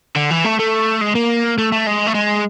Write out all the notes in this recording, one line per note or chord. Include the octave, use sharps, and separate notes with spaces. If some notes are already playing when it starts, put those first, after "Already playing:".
D3
E3
A3
A3
G#3
A#3
A3
A3
G#3
A3
G#3